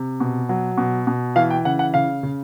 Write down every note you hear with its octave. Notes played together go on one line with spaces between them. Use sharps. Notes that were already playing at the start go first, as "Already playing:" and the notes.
Already playing: C3
B2
F#3
B2
B2
E3 F5
G5
C#3 F#5
F#5
C#3 F5
C#3